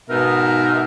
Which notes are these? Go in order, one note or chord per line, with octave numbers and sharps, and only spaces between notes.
G#2 B2 B3 D#4 A#4 E5